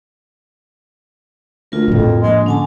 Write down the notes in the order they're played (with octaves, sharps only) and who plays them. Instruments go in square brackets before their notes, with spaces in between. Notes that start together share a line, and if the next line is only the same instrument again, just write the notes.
[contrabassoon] D2 [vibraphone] F4 A#4
[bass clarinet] F2 [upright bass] A2 C#3
[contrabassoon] A#1 [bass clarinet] G#3
[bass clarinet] D3 [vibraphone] C#4 G#5 A5